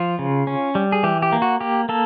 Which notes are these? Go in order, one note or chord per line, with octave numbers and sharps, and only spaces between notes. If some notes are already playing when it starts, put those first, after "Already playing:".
Already playing: F3 F4
C#3
C#4
G3
G#4
E3 G4
G4
A#3
F#4
A#3 G4
A#3 A4